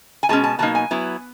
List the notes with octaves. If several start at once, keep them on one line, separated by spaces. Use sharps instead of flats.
G#5
B2 G#3 C#4 A5
A5
B2 F#3 A#3 D#4 A5
G#5
F#3 B3 E4